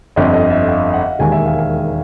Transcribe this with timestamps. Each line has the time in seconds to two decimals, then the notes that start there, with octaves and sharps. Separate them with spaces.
0.16 G1 F2 D3 D#5
0.33 D#5
0.50 E5
0.68 F5
0.94 F#5
1.19 E1 D#2 D#3 G#3 G#5
1.32 E5
1.45 F5
1.58 F5